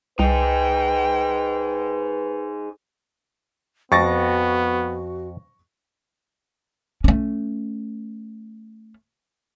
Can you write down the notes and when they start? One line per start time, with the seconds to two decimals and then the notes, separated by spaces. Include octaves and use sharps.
0.19 C2 D#4 G#4 B4 G5
3.92 F2 B3 F#4 C#6 A6 A#6
7.04 A3 C#4